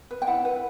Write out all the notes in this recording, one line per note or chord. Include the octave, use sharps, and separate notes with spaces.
B4
G5
E4 F#5
B4